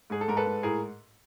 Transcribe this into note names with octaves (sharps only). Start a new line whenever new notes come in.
G#2 G#4
A4
G#2 A#4
A4 B4
G#2
A2 G#4 A#4